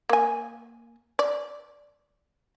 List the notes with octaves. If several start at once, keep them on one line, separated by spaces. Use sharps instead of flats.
A#3 G#5
D5